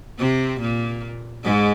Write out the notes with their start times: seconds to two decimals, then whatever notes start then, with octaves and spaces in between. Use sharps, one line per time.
0.19 C3 C4
0.60 A#2 A#3
1.44 G#2 G#3